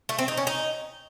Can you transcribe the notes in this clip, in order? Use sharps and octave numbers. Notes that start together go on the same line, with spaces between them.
A3
C4
D#4
C#4
D#4